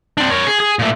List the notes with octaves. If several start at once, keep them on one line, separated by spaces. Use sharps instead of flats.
C4 D4
A#4 C#5
G#4
G#4
A#2 A3